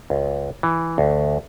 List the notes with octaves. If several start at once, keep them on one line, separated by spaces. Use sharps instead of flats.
C#2
E3
D2